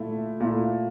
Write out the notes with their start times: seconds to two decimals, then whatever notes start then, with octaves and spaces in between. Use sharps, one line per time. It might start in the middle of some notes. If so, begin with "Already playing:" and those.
Already playing: A#2 A3 E4
0.40 A#2 A3 E4